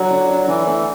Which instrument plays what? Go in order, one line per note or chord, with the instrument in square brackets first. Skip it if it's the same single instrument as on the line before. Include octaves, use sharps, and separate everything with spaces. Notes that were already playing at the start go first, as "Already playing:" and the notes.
Already playing: [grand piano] D3 D4 F#4 [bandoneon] F#3
[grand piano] D3
D4
[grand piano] D3 [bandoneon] E3
[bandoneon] E3 [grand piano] A3